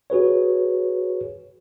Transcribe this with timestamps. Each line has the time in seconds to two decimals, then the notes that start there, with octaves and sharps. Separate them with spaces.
0.10 F#4 G#4 B4 C#5